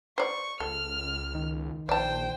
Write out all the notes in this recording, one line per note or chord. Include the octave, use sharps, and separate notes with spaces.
C5 D5 C#6
C#2 A4 F6
D#3
A#1 C5 D5 G5 A5